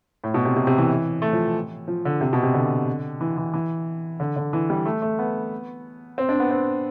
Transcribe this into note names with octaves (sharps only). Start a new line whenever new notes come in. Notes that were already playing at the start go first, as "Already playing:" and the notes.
A2
B2
C3
C3
C3
E3
A3
F3
F3
D3
C3
B2
C3
D3
E3
E3
E3
D3
D3
E3
G3
A3
A3
B3
C4
D4
B3
C4